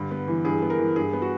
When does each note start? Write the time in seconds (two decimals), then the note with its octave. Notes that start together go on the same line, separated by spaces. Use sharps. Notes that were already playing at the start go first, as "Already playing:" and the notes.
Already playing: G2 D3
0.11 B3
0.28 E3
0.44 G2 G#4
0.62 B3
0.70 A#4
0.79 E3
0.96 G2 G#4
1.13 B3
1.22 F#4